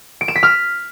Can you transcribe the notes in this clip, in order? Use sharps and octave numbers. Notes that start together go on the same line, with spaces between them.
D7
E7
B6
F6